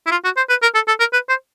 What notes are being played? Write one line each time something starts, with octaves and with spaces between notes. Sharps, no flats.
E4
F4
F#4
C5
B4
A#4
A4
A4
A#4
B4
C5